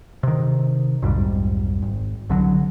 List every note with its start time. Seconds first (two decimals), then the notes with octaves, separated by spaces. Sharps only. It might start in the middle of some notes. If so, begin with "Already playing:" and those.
0.23 C3 D#3
1.02 B1 F2 G#2 G3
1.82 G#1
2.29 C2 D3 E3 F#3